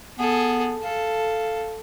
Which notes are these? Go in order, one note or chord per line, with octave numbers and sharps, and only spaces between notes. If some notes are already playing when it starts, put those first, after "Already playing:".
B3 G#4 A4
A4 F5